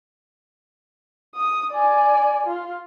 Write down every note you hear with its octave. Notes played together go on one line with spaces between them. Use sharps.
D#6
D5 G#5
F4